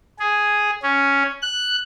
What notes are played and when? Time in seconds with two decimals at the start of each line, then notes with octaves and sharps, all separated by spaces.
0.19 G#4
0.83 C#4
1.42 F#6